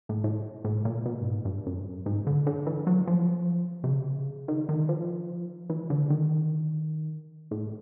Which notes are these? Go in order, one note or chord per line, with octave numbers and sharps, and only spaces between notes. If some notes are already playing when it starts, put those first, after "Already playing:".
A2
A2
A2
A#2
B2
G2
G#2
G2
F#2
G2
F#2
G#2
D3
D3
E3
F#3
F3
C3
C#3
D#3
D#3
F3
E3
D3
D#3
A2